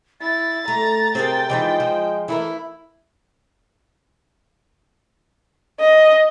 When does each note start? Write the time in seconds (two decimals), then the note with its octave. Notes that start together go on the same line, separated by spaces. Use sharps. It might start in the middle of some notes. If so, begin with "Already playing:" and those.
0.20 E4 A6
0.68 A3 A#5
1.15 C3 C4 G#4 A#4 G5
1.50 E3 F3 G#3 D#4
1.80 F3
2.28 E3 A3 E4 A#4
5.80 D#5